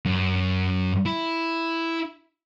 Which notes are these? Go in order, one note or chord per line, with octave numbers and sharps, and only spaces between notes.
F#2
E4